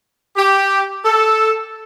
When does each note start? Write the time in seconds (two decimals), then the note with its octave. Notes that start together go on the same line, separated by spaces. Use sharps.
0.37 G4
1.05 A4